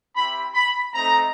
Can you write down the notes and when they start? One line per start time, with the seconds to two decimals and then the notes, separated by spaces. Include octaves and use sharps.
0.15 C4 E4 G4 B5
0.54 B5
0.93 A3 C4 D#4 A#5